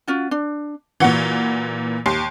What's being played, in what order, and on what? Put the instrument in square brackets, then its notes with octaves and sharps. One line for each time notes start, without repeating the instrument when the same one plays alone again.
[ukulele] C#4 F4 F#4
D4
[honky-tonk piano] A#2 E3 [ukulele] F#4 F#5
[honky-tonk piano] D#2 C6 C7